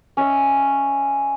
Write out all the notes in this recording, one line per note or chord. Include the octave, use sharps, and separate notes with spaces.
C#4 D#5 E5